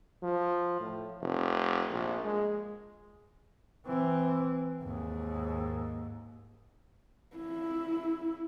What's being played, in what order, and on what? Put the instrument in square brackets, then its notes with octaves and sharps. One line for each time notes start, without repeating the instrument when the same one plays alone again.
[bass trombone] F3
A2
F1
A#1
G#3
[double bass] E3 C4
D#2 G#2
[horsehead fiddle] E4